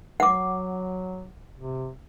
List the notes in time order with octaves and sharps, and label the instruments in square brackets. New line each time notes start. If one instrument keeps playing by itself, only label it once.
[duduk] F#3 [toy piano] F#5 D6
[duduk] C3